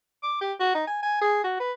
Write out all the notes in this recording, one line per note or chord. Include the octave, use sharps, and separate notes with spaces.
D6
G4
F#4
D#4
G#5
G#5
G#4
F#4
B4